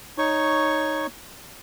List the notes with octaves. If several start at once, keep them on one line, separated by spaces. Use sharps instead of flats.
D#4 C#5 C#6